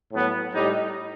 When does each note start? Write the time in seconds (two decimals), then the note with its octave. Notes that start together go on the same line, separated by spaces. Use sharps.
0.12 A2 F#3 B3
0.53 A2 G3 D#4